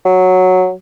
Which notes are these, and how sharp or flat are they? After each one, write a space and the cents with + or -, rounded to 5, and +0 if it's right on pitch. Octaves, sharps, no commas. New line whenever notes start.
F#3 -5